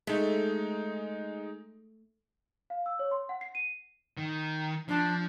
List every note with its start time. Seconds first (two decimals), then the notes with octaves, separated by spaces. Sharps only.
0.07 G#3 A3 D#4
2.70 F5
2.86 E6
2.99 C#5
3.11 C6
3.29 F#5
3.41 C7
3.55 D#7
4.17 D#3
4.88 F3 D4